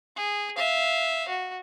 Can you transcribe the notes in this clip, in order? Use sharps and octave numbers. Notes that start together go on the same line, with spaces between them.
G#4
E5 F5
F#4